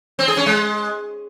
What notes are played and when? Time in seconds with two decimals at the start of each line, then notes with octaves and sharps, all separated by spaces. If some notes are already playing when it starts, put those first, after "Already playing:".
0.19 C4
0.28 G#4
0.37 C#4
0.46 G#3